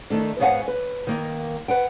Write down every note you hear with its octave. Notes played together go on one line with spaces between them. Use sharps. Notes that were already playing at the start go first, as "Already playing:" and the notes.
D#3 A3 D4
G#2 B3 C#5 F5 F#5 G#5
B4
D#3 A#3
B4 F#5 G5